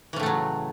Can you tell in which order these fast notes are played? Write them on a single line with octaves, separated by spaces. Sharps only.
E3 C#3 A2 A3 F#3